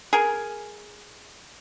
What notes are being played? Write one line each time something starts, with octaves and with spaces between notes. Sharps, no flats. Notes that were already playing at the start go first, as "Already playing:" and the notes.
G#4 A#4